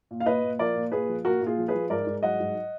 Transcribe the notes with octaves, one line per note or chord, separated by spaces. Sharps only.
A#2
F5
A#2 B4 D#5
A#2
F3 A#4 D5
A#2
A#2 G#4 B4
F3
A#2 F#4 A#4
A#2
F4 G#4
F3
G#4 B4
F3
G#2 A#4 D5
G#2
F#3 D#5 F#5
G#2